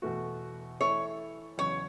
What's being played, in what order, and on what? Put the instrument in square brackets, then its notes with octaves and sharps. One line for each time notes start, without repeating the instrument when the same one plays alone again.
[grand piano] E2 B2 A3 F#4
[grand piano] E3 A3 E4 A4 [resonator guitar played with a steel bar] C#5
[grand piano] E2 C#3 F#3 B3 [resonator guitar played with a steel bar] C#5